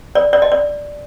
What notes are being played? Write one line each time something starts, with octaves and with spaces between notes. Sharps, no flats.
D5
D5
D#5
D5